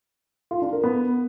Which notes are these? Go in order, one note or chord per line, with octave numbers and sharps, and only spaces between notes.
F4
D4
A#4
B3